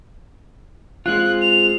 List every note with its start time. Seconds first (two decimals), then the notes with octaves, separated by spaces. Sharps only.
1.06 G#3 C4 F4 F#6
1.42 F7